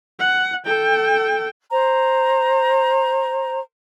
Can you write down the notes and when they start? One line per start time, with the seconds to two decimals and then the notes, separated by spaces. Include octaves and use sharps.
0.19 F#5
0.66 A4 G5
1.71 C5 A#5